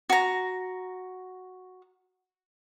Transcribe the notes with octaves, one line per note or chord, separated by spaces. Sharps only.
F#4 A#5